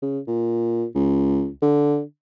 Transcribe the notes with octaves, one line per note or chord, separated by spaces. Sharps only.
C#3
A#2
C#2
D3